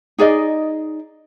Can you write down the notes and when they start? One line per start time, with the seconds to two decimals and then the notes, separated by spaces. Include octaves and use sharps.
0.18 D#4 G#4 D5 D#5